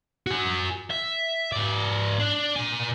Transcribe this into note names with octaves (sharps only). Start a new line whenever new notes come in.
F#4 G#5
E5
G#2 D5
D4
A#2 G#5